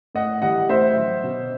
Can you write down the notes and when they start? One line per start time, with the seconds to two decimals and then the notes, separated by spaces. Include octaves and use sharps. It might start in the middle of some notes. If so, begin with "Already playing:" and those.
0.15 A2 D#5 F#5
0.42 E3 G3 D#5 F#5
0.69 A2 C5 E5
0.96 F#3
1.24 B2